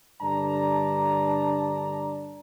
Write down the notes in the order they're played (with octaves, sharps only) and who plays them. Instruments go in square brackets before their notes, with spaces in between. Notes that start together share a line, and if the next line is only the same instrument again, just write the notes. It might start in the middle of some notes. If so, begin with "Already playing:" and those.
[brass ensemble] G2 D3 D5 A5 A#5